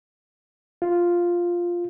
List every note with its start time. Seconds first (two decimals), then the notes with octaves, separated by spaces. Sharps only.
0.82 F4